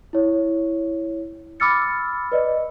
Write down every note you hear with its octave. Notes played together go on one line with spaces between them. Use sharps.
E4 C#5
B5 D6 E6 F6 A6 C#7
B4 D5 D#5